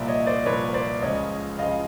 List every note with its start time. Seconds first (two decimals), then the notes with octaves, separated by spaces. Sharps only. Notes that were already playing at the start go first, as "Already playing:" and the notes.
Already playing: C2 A#2 F3 D5 E5
0.08 C#5 D#5
0.27 C5 D5
0.46 C2 A#2 F3 B4 C#5
0.74 C5 D5
1.02 C#2 C#3 F3 C#5 D#5
1.59 C#2 C#3 F3 D#5 F5